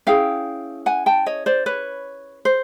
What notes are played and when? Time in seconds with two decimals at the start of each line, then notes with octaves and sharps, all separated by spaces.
0.07 C#4 E4 G#4 F5 G5
0.86 F#5 G#5
1.06 G5 A5
1.26 C#5 D#5
1.46 C5 D5
1.66 B4 C#5
2.45 C5